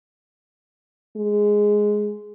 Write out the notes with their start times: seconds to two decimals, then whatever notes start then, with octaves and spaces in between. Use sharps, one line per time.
1.16 G#3